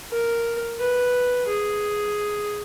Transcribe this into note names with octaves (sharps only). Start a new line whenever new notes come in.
A#4
B4
G#4